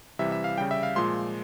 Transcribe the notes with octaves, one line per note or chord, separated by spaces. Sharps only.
C3 E3 G3 E5
E5
F5
C#3 G3 G5
E5
F5
A#2 F3 G#3 C6